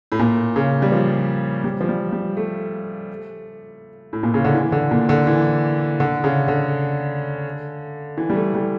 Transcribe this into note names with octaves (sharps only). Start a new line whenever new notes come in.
A2
A#2
C#3
G3
F3
G3
F3
G3
G3
A3
A2
A#2
C#3
D3
E3
D3
A#2
D3
E3
D3
C#3
D3
E3
G3
A3
G3